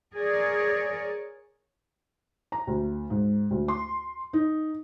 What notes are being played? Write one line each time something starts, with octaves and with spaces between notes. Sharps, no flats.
G#4 A#4 C#5 D5
A#5
D2
G#2
D2
C6
D#4